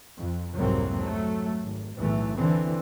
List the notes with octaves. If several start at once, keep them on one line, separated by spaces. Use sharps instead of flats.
F2
C2 F2 G#2 F#3 A#3 C4
F#3 A3
G#1
B1 E2 A2 E3 A3
D3 E3 C4